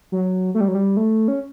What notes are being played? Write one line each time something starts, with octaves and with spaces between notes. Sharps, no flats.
F#3
A3
G3
F#3
G3
A3
C#4